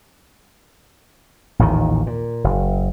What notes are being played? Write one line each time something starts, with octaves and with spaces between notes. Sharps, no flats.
A1 D#2 A#2 D#3
A#2
F#1